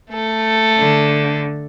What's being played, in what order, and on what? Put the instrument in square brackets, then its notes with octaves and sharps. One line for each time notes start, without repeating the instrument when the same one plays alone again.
[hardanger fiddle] A3 A4
[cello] D3